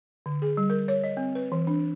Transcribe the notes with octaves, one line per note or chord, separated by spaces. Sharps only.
D3
G#4
G3
A#4
C#5
D#5
C4
B4
E3
D4